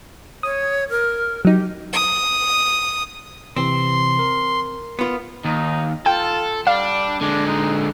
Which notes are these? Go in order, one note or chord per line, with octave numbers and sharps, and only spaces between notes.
C#5 D#6
A#4
F#3 D#4 G4
D#6
C3 E3 C4 C6
A#4
B3 F4
D#2 D#4
F4 A4 G5
G3 D4 F5
D3 G#3 D4
D#4